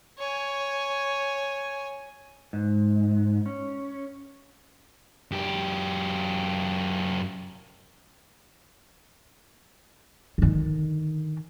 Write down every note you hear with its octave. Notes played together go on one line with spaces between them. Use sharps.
C#5 G#5
G#2
C#4
F#2 G4
D3 D#3